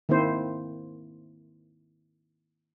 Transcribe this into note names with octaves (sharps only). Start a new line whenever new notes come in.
D#3 A#3 C4 E4 C5